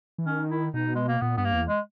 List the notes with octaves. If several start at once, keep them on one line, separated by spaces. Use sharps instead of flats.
E3
D#3 C#4
E4
B2 D#4
G#3
A#3
A#2 B3
G2 B3
A#3
E2
G#3